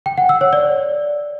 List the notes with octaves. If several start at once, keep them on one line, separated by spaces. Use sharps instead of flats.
G5
F#5
E6
C#5
D5